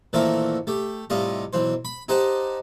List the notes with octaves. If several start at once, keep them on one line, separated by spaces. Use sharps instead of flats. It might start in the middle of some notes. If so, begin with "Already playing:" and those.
A#2 D#3 E3 A3 C4 A#4
A3 G4
A2 C3 G3 F4 D#5
B1 E3 C5
B5
D#4 G4 C5 D#5 F#5 A5